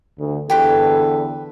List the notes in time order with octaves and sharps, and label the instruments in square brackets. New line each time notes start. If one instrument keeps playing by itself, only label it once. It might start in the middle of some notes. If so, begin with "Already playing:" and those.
[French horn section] D2
[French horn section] E2 D3 A4 [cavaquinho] G4 B4 C5